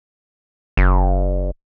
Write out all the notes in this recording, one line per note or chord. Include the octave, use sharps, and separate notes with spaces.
F#1